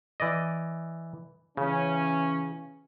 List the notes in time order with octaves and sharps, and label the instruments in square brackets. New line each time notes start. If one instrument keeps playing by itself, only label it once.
[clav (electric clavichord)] E3 D5 D#5
[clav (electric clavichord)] C#3 [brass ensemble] E3 C#4